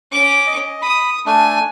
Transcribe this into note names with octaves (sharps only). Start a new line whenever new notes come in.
C#4 D6
D#5
B5 D#6
A3 D4 G#5